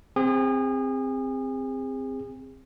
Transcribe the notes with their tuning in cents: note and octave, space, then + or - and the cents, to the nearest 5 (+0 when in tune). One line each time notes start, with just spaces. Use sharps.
C4 +0 G#4 -35